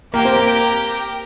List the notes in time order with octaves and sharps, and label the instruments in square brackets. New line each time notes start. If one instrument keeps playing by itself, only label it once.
[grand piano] A#3 [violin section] G4 A#4 G5
[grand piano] C4
A#3